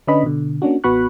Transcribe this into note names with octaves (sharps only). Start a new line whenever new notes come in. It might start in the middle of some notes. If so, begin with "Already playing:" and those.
D3 C#4 D4 B4 D#5 B5
B2 D3
A#3 C#4 D4 F#4
A1 B3 F#4 B5 C#6 F#6